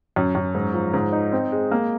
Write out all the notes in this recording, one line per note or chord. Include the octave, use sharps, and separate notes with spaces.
F#2
F#2
G#2
F3
G#2
D#4
C4
G#3
A#3